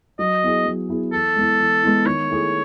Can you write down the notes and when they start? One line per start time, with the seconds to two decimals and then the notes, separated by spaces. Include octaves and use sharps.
0.19 F#3 D#5
0.43 B3 E4 G#4
0.65 F#3
0.89 B3 E4 G#4
1.12 E3 A4
1.36 G#3 B3 E4
1.60 E3
1.83 G#3 B3 E4
2.06 D#3 C#5
2.29 A3 E4 G#4